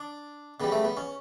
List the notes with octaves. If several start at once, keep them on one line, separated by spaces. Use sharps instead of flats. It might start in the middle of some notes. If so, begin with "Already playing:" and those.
Already playing: D4
C#3 G3 B3
A3
B3
C#4